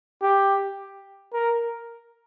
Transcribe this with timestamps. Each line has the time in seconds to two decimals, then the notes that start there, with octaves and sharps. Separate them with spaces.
0.22 G4
1.33 A#4